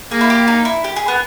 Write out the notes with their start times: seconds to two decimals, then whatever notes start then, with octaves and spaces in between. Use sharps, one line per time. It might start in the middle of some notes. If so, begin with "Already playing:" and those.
0.11 A#3 G#4
0.21 E4
0.30 G4
0.48 D#4
0.65 E4
0.84 G4
0.96 G#4
1.08 B3